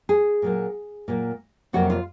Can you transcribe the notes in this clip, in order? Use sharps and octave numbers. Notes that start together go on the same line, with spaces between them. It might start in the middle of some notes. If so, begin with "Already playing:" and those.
G#4
A#2 F#3 A#3
A#2 F#3 A#3
F2 C3 F#3 A#3 F#4
F4